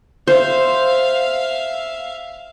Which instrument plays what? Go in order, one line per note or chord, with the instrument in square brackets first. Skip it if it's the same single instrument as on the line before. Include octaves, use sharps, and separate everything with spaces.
[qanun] C5 [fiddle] E5 F5